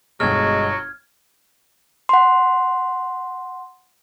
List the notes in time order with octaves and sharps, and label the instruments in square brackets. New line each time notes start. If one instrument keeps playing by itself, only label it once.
[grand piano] G1 B2 [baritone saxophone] F#3 [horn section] G#3 [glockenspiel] F6 G#6
[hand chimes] F#5 C6